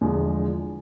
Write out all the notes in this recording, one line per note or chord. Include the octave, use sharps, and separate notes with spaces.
E2 D3 F3 G#3